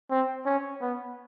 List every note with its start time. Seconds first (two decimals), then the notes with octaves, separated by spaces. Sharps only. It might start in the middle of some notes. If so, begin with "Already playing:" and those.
0.11 C4
0.46 C#4
0.81 B3